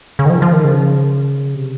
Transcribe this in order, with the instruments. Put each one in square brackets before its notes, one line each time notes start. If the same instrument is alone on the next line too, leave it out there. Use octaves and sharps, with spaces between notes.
[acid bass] C#3
D#3
F3
F3
D#3
C#3
C3